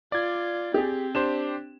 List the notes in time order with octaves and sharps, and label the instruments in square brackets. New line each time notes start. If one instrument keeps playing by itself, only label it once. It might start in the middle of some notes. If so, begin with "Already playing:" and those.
[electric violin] F4 [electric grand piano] D5 G#6
[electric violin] C4 [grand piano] G4 G#4
[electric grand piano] D4 G4 C5 [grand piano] E7